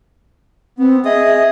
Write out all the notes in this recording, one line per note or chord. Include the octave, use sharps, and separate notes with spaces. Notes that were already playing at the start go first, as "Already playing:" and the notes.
B3 C4
G#4 D#5 E5 D#6